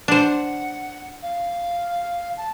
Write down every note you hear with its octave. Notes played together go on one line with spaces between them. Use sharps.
D4 C5 F#5
F5
A5